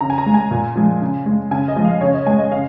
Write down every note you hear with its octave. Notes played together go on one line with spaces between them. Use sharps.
C#3 A#5
G#5
A#5
G#3
G#5
A#2
F3 G#3
C#3
G#3
C#3 G#5
D#5
F3 G#3
F5
C#3 C#5
D#5
G#3 G#5
D#5
C#3 F5